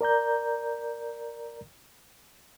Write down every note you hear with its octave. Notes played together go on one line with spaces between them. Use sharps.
A#4 D5 A#5 G6